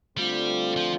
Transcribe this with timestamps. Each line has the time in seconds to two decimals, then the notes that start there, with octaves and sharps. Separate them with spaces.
0.18 D3 G3 A3 C4 F4
0.77 F3